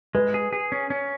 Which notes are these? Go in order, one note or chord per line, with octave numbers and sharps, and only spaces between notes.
G#3 B4
G#4
G#4
C#4
C#4